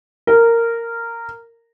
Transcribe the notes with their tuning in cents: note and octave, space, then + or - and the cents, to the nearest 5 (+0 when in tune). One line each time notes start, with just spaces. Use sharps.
A#4 -10